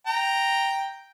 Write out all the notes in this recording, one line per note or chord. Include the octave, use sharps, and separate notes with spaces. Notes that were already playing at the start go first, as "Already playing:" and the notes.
G5 A#5